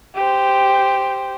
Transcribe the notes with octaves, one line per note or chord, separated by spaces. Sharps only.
G4 C5